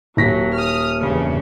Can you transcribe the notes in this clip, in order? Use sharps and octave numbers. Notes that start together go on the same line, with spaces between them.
D#1 F#3 A#6 B6
D#6 F6
E2 G2 C#3